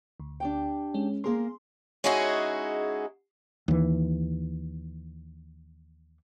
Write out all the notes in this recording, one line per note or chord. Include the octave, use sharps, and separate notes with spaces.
D2
D4 G4 G5
G#3 C#4
A#3 G#4 A#4 C6
G#3 C#4 D#4 E4 F#4 G#4
D#2 E3